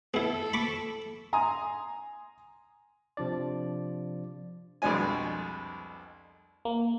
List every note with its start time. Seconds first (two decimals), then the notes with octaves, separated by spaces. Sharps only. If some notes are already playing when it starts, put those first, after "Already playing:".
0.14 B3 E4 A4
0.53 B5 C#6 D6
1.33 G#5 A#5 C6 D#6
3.17 C3 F3 D4 D5
4.82 C2 F2 B2 G#3 D4 G#5
6.65 A#3